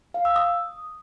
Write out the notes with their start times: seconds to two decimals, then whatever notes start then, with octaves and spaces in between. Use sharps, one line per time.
0.14 F5
0.25 E6
0.36 D#6